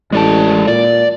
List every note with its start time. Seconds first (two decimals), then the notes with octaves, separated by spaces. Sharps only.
0.12 A1 G#3 D5 A5
0.67 A#2 D5